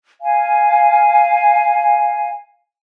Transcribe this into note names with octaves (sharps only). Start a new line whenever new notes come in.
F5 G#5